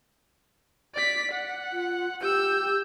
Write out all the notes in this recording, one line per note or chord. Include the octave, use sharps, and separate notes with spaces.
D5 B6
F#5
F4
G4 E6 G6